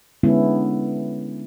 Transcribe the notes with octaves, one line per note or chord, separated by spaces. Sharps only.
D3 G#3 B3 C#4 E4